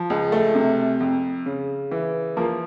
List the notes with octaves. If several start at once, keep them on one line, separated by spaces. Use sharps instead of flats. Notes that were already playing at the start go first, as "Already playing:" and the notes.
Already playing: F3
C#2
A3
C3
F2
C#3
E3
F3 A#3